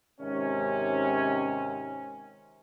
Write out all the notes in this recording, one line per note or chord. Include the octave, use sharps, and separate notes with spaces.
G#2 C3 D#3 C#4